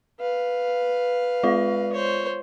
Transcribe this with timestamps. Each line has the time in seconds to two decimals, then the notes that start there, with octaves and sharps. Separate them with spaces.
0.19 B4 F5
1.43 G#3 F4 D5
1.93 C5 C#5